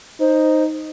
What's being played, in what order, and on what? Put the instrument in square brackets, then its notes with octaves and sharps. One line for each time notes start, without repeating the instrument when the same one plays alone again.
[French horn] D#4 [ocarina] C5